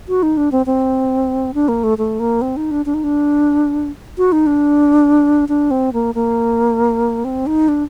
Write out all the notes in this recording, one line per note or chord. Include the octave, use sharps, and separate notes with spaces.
F#4
D#4
D4
C4
C4
D4
A#3
A3
A3
A#3
C4
D#4
D4
D4
D#4
D4
F#4
D#4
D4
D4
C4
A#3
A#3
C4
D#4
D4